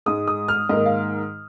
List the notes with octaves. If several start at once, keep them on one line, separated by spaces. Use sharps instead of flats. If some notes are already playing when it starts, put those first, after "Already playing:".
G#2 G#3 D#6
D#6
F6
G#2 D#3 A#3 D#5
F5